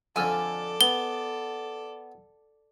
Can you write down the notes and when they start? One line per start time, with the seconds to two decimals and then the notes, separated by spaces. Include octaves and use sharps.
0.16 F2 D3 A4 D5 G#5 E6 F6
0.81 B3 G7